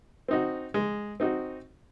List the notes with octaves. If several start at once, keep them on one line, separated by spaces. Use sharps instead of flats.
C4 D#4 F#4
G#3
C4 D#4 F#4